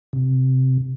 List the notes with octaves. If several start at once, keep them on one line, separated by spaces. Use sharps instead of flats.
C3